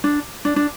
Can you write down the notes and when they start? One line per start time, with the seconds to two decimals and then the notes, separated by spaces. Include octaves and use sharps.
0.04 D4
0.45 D4
0.56 D4